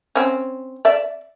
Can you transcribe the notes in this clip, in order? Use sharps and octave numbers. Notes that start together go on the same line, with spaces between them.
C4 C#4
D5 E5